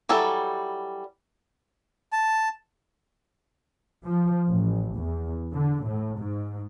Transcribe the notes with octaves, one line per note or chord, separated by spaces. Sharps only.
E3 F#3 G3 A4
A5
F3
A1
E2
D3
A2
G#2